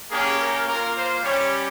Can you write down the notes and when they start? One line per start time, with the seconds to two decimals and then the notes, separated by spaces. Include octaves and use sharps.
0.11 A#3 C#4 G4 G#4
0.40 A#4
0.68 A#3 F4 A#4
0.96 C5
1.24 G3 C#4 G4 C#5